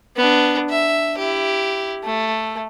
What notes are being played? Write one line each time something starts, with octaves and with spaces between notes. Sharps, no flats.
B3 D4
E5
E4 G4
A3